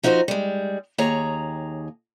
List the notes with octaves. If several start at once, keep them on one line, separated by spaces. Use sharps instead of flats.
F3 D#4 F#4 B4 C5
G3 G#3
D#2 G#4 C#5 A#5